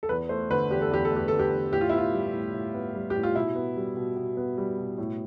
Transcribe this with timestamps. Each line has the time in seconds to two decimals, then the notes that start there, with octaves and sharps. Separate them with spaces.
0.03 A4
0.09 E2 B4
0.29 A3 C5
0.50 D3 B4
0.70 E2 G4
0.82 A4
0.91 E2 G4
1.05 A4
1.11 A3
1.16 G4
1.28 D3 A4
1.39 G4
1.52 E2
1.72 A2 G4
1.81 F4
1.89 B3 E4
1.98 F4
2.13 G3
2.34 A2
2.54 A2
2.74 B3
2.95 G3
3.10 A2 G4
3.23 F4
3.35 B2 E4
3.55 B3
3.76 G3
3.97 B2
4.16 B2
4.37 B3
4.58 G3
4.78 B2
4.98 A2